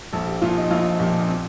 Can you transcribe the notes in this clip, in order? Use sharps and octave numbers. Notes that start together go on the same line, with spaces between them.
A#1 A4
G4
A#2 F3 F4
D#4
A#1 F4
A#2 F3 G4
D4
C4